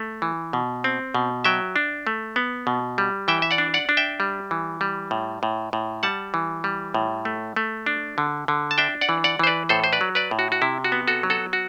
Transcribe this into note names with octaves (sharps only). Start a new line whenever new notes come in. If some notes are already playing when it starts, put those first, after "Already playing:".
Already playing: A3
E3
B2
C4
B2
F#3 E5 G5
D4
A3
B3
B2
G3
E3 E5 G5
E5
D5 F#5
D4
D5 F#5
D4
E5 G5
G3
E3
G3
A2
A2
A2
G3 F#5 A5
E3
G3
A2
A3
A3
D4
D3
D3
A5
D4 E5 G5
D5 F#5
E3
D5 F#5
E3 C5
B4 D5
A2 A4 C5
C5
B4 D5
F#3
B4 D5
A2
F#4
F#4
C3 E4
F#4
B3
F#4 A4
F#3
F#4 A4
F#4